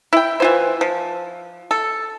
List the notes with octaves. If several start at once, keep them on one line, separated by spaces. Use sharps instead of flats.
E4 G5
E3 F4 C5
F3
A4